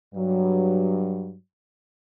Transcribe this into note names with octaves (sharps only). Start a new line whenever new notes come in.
G2 F#3